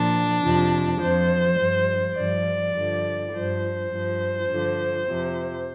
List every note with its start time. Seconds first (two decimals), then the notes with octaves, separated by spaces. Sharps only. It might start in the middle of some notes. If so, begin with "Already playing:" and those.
Already playing: A#2 F3 D4
0.42 F2 C3 F3
0.99 F2 F3 C5
1.58 G2 F3
2.16 G2 F3 D5
2.74 G2 D3 F3
3.32 G2 F3 C5
3.90 G2 F3
4.48 G2 D3 F3
5.05 F2 C3 F3